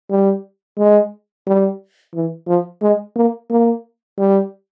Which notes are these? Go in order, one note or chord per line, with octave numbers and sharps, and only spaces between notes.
G3
G#3
G3
E3
F3
G#3
A#3
A#3
G3